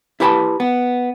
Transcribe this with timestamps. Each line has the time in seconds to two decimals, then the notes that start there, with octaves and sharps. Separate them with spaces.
0.20 E4 G4 B4 G5 A5 B5
0.60 B3